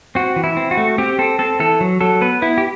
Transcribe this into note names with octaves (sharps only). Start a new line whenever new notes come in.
C4 F#4
E3
E4
C4
F#4
A3
C4 G4
C4 A4
C4 A4
E3 A4
F#3
F#3 A4
B3 B4
B3 E4
G4